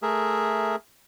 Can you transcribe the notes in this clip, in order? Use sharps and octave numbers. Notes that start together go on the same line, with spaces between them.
A3 G#4 A#4 E5